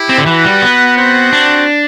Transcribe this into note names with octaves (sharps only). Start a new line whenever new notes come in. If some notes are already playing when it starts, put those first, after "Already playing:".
Already playing: E4 G4
C4
D3
E3 F#4 B4 F#5
G3
B3
C4 F#4 C5 F#5
D4